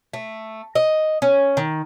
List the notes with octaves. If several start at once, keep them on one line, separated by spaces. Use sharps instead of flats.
A3
D#5
C#4
D#3